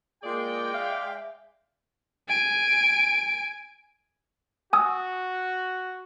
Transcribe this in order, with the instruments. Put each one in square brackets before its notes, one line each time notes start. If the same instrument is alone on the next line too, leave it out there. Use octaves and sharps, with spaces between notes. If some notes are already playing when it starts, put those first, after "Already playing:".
[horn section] G#3 D5 G5 [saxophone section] A#3 F4 G#4
[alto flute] E5 [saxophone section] F5
[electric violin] G#5 D7
[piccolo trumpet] F#4 [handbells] G#5 D#6 E6